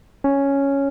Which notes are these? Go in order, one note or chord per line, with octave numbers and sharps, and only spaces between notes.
C#4